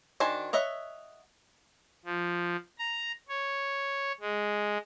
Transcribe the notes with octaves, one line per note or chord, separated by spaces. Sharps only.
D#3 D4 F#4 C5 G#5
C#5 D#5 E5 F#5
F3
A#5
C#5
G#3